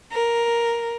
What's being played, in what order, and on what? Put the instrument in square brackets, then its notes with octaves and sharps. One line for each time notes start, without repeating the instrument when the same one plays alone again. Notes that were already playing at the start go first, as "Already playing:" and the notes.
[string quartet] A#4